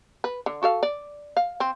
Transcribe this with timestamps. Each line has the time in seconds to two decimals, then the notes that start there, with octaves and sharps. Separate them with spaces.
0.24 B4
0.46 D3
0.63 F#4 A4 F5
0.83 D5
1.37 F5
1.60 C4